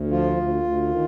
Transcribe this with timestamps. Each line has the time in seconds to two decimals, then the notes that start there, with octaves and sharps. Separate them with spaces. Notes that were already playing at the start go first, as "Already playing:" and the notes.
Already playing: D2
0.11 F3 F4
0.37 D2
0.64 D2
0.91 D#3